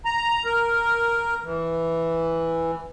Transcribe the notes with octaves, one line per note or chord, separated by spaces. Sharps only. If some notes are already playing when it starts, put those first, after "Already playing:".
A#5
A#4
E3